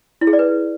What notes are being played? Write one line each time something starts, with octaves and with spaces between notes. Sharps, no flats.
E4
G#4
D5
B4